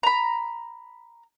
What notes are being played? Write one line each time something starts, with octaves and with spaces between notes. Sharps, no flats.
A#5 B5